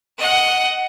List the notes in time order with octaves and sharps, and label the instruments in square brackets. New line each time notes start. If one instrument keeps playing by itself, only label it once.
[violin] D#5 F#5